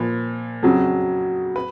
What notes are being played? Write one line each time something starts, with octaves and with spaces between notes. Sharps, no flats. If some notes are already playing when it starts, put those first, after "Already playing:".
Already playing: A#2 F3 B4
F2 C#3 F#3
B4